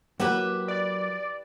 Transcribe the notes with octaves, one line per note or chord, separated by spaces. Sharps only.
F#3 A#3 E4 G4 B4 F#5
D5